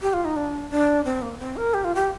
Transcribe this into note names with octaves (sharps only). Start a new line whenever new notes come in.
G4
F4
D#4
D4
D4
C4
A#3
C4
A#4
G4
F4
G4